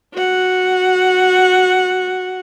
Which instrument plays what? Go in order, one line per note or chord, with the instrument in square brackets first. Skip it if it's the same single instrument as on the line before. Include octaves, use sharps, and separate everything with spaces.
[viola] F#4 F#5